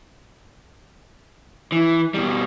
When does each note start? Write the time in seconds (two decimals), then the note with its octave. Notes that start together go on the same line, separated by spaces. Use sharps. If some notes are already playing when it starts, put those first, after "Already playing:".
1.72 E3
2.14 B2 G3